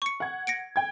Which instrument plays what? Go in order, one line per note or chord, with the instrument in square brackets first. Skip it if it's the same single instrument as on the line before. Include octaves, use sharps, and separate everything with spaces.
[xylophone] C#6 C#7
[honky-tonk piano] F#5 G#6
[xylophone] A#6 C#7 D7
[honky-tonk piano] G5 G#6